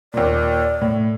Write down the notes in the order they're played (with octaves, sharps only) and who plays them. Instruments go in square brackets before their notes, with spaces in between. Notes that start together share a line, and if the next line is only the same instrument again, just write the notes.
[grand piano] D#2 A#2 [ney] D5
[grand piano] A2